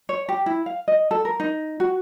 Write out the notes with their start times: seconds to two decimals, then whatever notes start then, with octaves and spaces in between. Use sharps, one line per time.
0.09 C#5
0.29 G4
0.46 E4
0.66 F5
0.88 D#5
1.11 A4
1.25 A#4
1.40 D#4
1.80 F#4